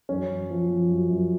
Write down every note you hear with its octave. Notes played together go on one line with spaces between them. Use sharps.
F#2 C#4
F#2
F3
F3
F#2
F#2